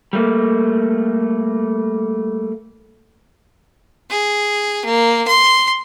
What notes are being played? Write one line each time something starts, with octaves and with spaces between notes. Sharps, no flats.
G3 A3 A#3
G#4
A#3
C6